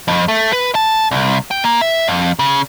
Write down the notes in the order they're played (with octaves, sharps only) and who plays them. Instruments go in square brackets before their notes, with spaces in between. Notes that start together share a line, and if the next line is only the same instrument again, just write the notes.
[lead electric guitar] F2
A3
B4
A5
C2
G5
A#3
E5
F2
C#3